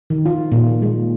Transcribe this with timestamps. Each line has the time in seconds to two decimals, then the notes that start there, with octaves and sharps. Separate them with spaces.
0.10 D#3
0.26 F4
0.52 A#2
0.82 G#3